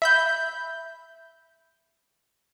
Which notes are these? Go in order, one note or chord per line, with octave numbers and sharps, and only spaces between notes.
E5 B5 G6